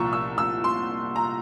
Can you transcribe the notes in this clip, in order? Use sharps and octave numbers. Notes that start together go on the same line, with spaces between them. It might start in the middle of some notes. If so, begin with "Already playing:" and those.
Already playing: C2 A#2 F3 A#5 C#6 E6
E6
E6
C6
A#5